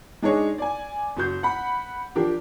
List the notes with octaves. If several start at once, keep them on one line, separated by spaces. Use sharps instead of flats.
G#3 D4 D#4 G#4 C#5
D5 G#5
F#1 F#4 G6
F#5 B5
F3 D4 G4 A#4